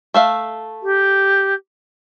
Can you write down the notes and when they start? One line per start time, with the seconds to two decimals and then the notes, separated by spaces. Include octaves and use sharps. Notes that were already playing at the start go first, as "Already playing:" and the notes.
0.14 A3 E5 F5
0.82 G4